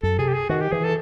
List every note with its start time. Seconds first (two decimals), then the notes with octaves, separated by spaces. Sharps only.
0.03 F#2 A4
0.18 C3 G#4
0.29 G4
0.34 G#4
0.49 D#3 F#4
0.61 G4
0.72 E3 G#4
0.84 A4